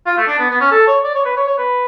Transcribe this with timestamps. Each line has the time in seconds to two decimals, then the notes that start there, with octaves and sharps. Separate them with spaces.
0.06 F4
0.17 A3
0.28 D4
0.39 B3
0.50 B3
0.61 C#4
0.71 A4
0.87 C#5
1.04 D5
1.15 C#5
1.25 B4
1.37 C#5
1.47 C#5
1.58 B4